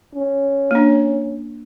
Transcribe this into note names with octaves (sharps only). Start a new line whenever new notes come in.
C#4
A#3 D4